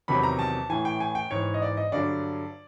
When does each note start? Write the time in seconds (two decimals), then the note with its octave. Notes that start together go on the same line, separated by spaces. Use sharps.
0.08 E2 C3 D#3 F#3 B5
0.23 A#5
0.39 A5
0.70 A2 E3 G#5
0.85 G5
1.00 G#5
1.15 G5
1.31 G#2 E3 C#5
1.54 D#5
1.62 D5
1.77 D#5
1.92 G2 D3 F#3 D5